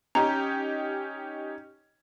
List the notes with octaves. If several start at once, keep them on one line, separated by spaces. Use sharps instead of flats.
C#4 D#4 G4 A#5